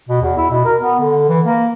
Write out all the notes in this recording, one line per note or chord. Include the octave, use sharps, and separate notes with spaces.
B2
E2
E4
B2
A#4
B3
D3
E3
A#3